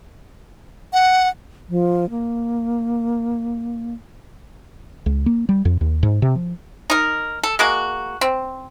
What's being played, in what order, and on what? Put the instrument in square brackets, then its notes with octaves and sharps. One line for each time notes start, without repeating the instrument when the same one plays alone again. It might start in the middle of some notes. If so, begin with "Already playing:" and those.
[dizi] F#5
[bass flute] F3
A#3
[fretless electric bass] C#2
A#3
G3
F2
D#2
G#2
C3
F3
[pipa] D#4 A#4
A4
G#3 A#3 F#4
C4